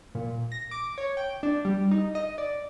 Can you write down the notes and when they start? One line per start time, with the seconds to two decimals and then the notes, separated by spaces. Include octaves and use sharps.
0.15 A#2
0.52 A#6
0.71 D6
0.98 C#5
1.17 G5
1.43 D4
1.65 G3
1.91 D#4
2.15 D#5
2.38 D5